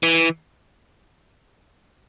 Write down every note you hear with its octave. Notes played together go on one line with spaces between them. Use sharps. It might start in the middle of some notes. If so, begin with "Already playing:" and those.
E3